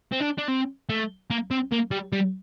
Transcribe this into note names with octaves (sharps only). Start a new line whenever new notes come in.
C4
D4
D4
C4
A3
A#3
C4
A#3
G3
G3